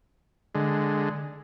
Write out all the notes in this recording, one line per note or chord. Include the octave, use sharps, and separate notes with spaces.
D3 G#3